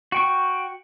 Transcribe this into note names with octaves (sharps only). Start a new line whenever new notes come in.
F#4 G5 C#6